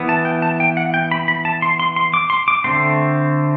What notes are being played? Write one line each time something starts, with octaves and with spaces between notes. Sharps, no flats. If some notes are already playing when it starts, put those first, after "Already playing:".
Already playing: E3 B3
A5
G5
A5
G5
F#5
G5
B5
B5
A5
C6
C6
C6
D6
C6
D6
D3 A3 C4 C6